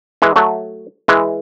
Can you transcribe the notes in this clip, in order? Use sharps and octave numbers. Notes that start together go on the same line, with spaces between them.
E3 G#3
F#3 A3
E3 G#3